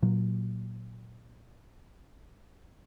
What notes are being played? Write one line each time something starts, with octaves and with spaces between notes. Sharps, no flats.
A#2 F#3